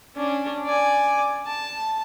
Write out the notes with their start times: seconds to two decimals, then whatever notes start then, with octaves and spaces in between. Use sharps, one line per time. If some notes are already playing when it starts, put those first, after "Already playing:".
0.16 C#4 D4
0.65 D5 G#5
1.46 A5